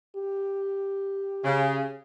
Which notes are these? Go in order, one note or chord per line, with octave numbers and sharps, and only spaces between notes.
G4
C#3